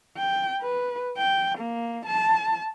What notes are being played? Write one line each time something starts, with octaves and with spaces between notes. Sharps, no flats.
G5
B4
G5
A#3
A5